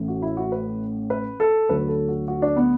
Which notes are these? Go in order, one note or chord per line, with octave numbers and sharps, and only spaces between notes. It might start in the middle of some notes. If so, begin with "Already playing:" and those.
Already playing: A1 A2 E3
F#4
E4
F#4
B4
B4
A4
D2 D3 F#3 B4
A4
F#4
F#4
D4
B3